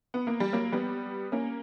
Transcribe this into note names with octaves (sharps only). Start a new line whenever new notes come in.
B3
A#3
G3
F#3 A#3
G3 B3
A#3 C#4